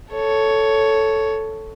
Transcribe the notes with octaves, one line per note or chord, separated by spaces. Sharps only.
A4 C#5